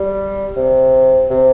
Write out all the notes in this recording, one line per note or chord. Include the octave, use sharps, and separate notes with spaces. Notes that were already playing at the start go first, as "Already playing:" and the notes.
Already playing: G3
C3
C3